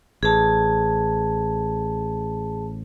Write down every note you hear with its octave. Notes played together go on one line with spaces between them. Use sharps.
A1 G#4 A5